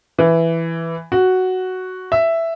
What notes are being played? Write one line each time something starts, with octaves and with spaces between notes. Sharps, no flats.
E3
F#4
E5